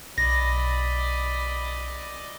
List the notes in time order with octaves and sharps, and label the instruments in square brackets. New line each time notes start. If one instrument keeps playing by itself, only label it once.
[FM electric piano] B1 [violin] D5 D#5 [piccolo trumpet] B5 [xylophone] A#6